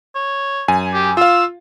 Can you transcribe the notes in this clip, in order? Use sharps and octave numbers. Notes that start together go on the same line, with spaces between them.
C#5
F#2 G#5
G4
F4 F5 E6